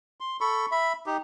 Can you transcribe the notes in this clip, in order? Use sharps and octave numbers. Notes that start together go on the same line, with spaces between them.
C6
A4 B5 C#6
E5 B5
D#4 G4